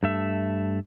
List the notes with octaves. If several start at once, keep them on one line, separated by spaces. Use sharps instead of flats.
G2 A3 E5